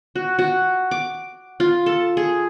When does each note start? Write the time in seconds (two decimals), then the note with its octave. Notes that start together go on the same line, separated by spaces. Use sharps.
0.16 F#4
0.39 F#4
0.91 D6
1.60 F4
1.86 A4
2.17 G#4